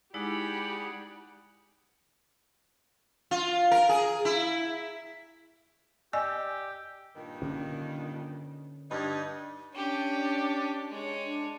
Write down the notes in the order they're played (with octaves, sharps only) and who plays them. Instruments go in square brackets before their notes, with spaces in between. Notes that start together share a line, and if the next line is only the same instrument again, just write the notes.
[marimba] G#3 D#4 E4 [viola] G4 B5 [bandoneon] G#4 D5 F#5
[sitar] F4
A#4
G#4
E4
[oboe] G4 [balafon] D5 D#5 G#5 [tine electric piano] E6
[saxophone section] G2 A#2 D#3
[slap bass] D3 C#4
[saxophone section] G2 D#4
[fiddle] C#4 G4 [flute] D4
[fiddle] G#3 C#5
[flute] D4